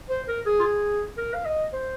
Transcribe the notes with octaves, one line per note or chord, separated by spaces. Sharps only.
C5
A#4
G#4
F4
G#4
A#4
F5
D#5
C5